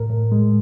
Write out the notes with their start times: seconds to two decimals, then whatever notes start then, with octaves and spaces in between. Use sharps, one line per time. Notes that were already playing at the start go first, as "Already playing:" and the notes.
Already playing: A2 A#4
0.10 A2
0.32 G#3